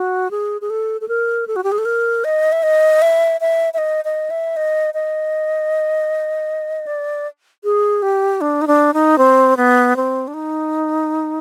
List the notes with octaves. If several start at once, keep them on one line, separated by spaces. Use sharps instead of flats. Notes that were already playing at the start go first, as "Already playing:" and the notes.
Already playing: F#4
G#4
G#4
A4
A4
A#4
A4
F#4
G4
G#4
A4
A#4
D#5
E5
D#5
E5
E5
E5
D#5
D#5
E5
D#5
D#5
D5
G#4
G4
D4
D#4
D4
D#4
C4
B3
C4
D4
D#4